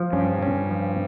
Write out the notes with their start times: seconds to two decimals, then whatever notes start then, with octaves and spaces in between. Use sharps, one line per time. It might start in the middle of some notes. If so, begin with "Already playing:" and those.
Already playing: F3
0.13 G2 C#4
0.42 C#4
0.71 F3